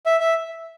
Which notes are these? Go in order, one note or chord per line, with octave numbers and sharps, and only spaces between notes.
E5
E5